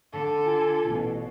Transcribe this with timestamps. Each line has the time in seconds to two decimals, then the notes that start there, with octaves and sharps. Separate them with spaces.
0.11 D3 A4
0.46 F4 G#5
0.88 A1 B2